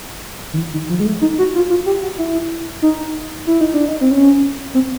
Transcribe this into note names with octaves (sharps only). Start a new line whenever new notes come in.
D#3
E3
D#3
F3
G#3
A3
D#4
F#4
F4
F4
G4
F#4
E4
D#4
E4
D#4
D4
D#4
C4
C#4
C4